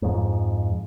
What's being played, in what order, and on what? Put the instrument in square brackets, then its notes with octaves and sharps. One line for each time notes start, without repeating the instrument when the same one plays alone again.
[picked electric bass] F2 G#2